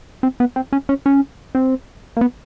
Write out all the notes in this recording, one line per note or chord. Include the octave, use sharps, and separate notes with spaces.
C4
B3
C4
C#4
C#4
C#4
C4
A#3
B3